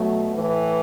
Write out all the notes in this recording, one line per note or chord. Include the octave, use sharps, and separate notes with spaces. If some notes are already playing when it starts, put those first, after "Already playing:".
Already playing: B2 F#3 A3
A2 E3